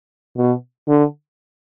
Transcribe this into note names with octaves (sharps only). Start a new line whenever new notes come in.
B2
D3